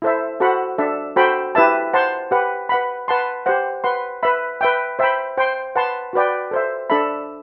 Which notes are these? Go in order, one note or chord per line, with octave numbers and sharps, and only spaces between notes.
E4 A4 C5 E5
F#4 A4 C5 F#5 B5
D4 A4 E5
F#4 A4 C5 G5 B5
E4 G4 B4 E5 A5
C5 F#5 A5 C6
G4 B4 F#5
B4 F#5 B5
B4 F#5 A5 C6
G4 C5 F#5
B4 F#5 C6
B4 E5 B5
B4 E5 G5
C5 E5 G5 B5
C5 G5 C6
B4 F#5 A5 C6
F#4 B4 D5 G5
A4 C5 E5
D4 A4 E5 B5